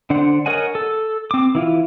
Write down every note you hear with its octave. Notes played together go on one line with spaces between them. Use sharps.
D3 D4 C5 F#5
A#4 C#5 D#5 F#5 G#5
A4
C4 D6
E3 E4 F4